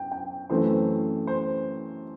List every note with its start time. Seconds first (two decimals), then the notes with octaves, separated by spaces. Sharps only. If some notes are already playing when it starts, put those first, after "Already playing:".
Already playing: F#2 G5
0.12 G5
0.50 F#2 E3 A3 C4 C5
1.27 C5